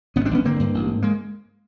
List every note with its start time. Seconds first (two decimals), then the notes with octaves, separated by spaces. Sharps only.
0.16 G#1 B3 C#4
0.25 C4 D4
0.31 G#1 B3 C#4
0.45 D3 A#3 C4
0.59 G2
0.75 A1
0.88 G#2
1.02 G#3 A#3